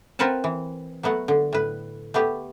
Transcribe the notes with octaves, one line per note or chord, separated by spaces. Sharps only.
C4 F4 A#4 B4 F#5 A5
E3
F#3 A3 B3 F#5
D3
A2 B4
A3 B3 G4